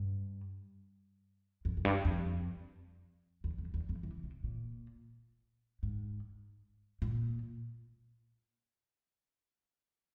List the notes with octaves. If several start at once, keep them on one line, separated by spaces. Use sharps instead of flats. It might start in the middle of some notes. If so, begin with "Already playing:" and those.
Already playing: G2
F2
F2
G2
F2
E2
F2
E2
F2
E3
C3
A#2
G#2
A#2